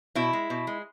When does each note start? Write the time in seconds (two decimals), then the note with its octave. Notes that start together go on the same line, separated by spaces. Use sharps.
0.15 B2 E4
0.33 G#3
0.50 B2
0.67 G#3